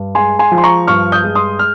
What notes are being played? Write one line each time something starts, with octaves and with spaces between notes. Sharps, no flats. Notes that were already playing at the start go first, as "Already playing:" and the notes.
Already playing: G2
G#3 G#5 C6
G#5 C6
F3
C6
A#5 C#6
G2 C#6 F6
D#6 G6
G#3
C6 D#6
F6